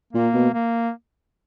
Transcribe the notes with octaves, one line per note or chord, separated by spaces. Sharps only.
A#2 A#3
B2
A#3